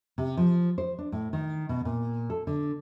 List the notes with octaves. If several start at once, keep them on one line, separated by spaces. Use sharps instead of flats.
C3
F3
C5
D4
A2
D#3
B2
A#2
A4
D3